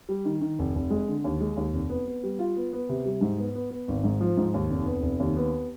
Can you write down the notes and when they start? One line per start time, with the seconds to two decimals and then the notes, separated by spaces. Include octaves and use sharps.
0.09 G3
0.25 D#3
0.41 D#3
0.59 F1
0.75 F1
0.90 G#3
1.08 D3
1.24 D#2
1.41 G#3
1.57 D#2
1.73 F1
1.90 B3
2.07 B3
2.23 G3
2.39 F4
2.56 B3
2.73 B3
2.89 C3
3.05 G3
3.21 G#2
3.38 B3
3.55 B3
3.71 B3
3.88 G#1
4.04 G#2
4.21 F3
4.37 G#2
4.54 D#2
4.70 F1
4.86 B3
5.02 F1
5.20 D#2
5.37 B3